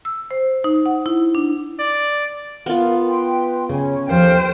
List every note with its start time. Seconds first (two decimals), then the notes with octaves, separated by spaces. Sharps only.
0.05 E6
0.31 C5
0.64 D#4
0.86 F#5
1.06 E4
1.35 D4
1.79 D5
2.66 B3 F4 A4 A#4 F5
3.06 B4 G5 C6
3.69 C#3 C#4 G#5
4.08 D#2 F3 A4 C5 G5 F6